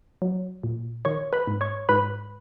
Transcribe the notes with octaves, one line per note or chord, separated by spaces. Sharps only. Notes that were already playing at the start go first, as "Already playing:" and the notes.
F#3
A#2
D#3 C#5 C#6
B4 B5
G#2
C#5 C#6
G#2 B4 B5